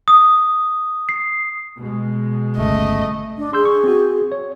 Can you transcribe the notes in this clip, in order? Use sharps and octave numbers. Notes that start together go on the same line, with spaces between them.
D#6
C7
B2 G#3
G1 C#2 A3 D#5
D4
G#4 C6 E6 G6
C#6
C4 F#4
C#5